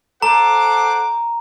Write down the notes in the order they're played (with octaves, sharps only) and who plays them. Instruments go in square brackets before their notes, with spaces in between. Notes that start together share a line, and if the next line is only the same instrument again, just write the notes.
[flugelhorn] A4 [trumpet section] C5 F#5 D6 [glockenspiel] A#5